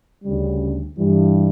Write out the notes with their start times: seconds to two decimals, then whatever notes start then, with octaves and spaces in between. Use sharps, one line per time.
0.24 D2 C#3 G3
0.96 G2 E3 G3